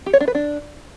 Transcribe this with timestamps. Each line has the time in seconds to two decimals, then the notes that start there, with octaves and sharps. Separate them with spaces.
0.06 G4
0.13 C#5
0.20 D4
0.28 B4
0.35 D4